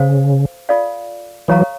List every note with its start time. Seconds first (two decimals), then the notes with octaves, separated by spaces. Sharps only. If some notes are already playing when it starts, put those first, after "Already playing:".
Already playing: C#3 A4 C5 F5
0.69 F4 A4 D5 F5
1.48 E3 F#3 A4 C#5 F5 A#5 C#6